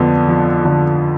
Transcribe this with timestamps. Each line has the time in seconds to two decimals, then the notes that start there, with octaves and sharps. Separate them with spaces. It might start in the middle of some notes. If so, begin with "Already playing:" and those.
Already playing: F2 D3 F3 B3
0.28 F3
0.65 D3